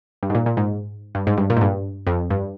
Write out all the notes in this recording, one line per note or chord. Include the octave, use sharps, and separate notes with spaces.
G2
G#2
A#2
A#2
G#2
G2
G#2
G2
A#2
G#2
G2
F2
G2